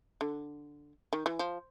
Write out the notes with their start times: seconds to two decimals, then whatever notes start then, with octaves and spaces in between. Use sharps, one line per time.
0.21 D3
1.13 D#3
1.26 E3
1.39 F3